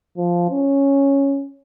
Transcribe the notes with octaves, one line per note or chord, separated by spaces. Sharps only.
F3
C#4